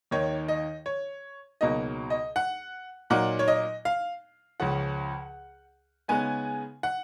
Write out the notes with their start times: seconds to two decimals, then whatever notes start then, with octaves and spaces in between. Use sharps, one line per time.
0.11 D#2 D#3 A#3 D#4 C#5
0.48 D#5
0.86 C#5
1.61 C#2 B2 F#3 A#3 D#4 D#5
2.10 D#5
2.36 F#5
3.10 A#2 F#3 A#3 D#4 F#5
3.39 C#5
3.48 D#5
3.85 F5
4.60 C#2 C#3 F3 F#5
6.08 C#3 G#3 B3 D#4 G#5
6.83 F#5